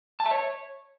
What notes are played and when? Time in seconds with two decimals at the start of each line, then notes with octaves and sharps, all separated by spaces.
0.20 A5
0.26 E5
0.31 C#5